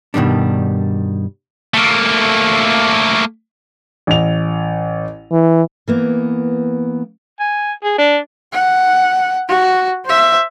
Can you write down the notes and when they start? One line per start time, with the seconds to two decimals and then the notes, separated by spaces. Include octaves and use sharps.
0.14 G2 B2 D#3 G3 D4
1.74 A3 A#3
4.07 A1 F7
5.31 E3
5.88 E3 A#3 B3
7.40 G#5
7.84 G#4
7.98 D4
8.52 F#5
9.48 F#4
10.05 C5 E5